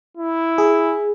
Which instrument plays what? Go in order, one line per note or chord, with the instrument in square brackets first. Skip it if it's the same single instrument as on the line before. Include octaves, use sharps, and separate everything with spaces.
[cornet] E4
[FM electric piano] G#4